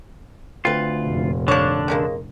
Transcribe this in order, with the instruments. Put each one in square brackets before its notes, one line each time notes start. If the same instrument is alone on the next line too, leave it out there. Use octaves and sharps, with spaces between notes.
[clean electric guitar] D2 F4 [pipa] C4 B4
[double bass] F1 A#2
[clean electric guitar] D3 D4 [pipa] F3 C#5
[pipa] C#3 G#3 A#3